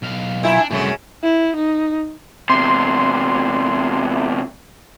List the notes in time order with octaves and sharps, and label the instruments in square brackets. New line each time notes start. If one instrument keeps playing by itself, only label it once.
[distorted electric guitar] B1 F5
[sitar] A#2 E4 E5
[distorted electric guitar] D4
[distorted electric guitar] C2 A3 [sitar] F#2 C#3
[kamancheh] E4
D#4
[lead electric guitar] E2 C3 [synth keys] C6